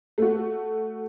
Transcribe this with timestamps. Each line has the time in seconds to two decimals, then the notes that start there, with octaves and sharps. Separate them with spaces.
0.18 A3 F#4